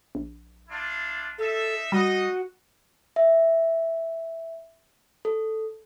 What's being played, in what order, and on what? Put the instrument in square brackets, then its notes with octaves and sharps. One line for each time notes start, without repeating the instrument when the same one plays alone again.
[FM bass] A#1
[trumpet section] D4 E4 F4
[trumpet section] D#4 E5 [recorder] A4
[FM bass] G3 [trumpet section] D#4 D#5 [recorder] F#4
[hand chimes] E5
A4